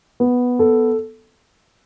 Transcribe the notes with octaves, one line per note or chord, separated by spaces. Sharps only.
B3
A4